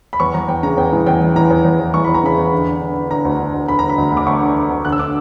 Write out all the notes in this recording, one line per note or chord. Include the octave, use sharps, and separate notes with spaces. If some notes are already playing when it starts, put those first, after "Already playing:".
B5
E2 C#6
E2 A#5
E2 G5
C#3 A#5
E2 G5
E3
E2 G5
E3
E3 A#5
E2
E2
E2
E3 C#6
E2 B5
A#5
C#3 B5
E2
D3
D3
D3
D3
D3 A#5
D2
D3
D2
D3 B5
D3 A#5
B5
D2
D2
D6
D2 C#6
D3
D3
D2
D3 F#6
E6
D3 D6